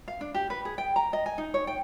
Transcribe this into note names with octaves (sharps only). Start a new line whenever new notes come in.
F5
D4
G4
B4
G#4
G5
A#5
D#5
G#5
D#4
C#5
G5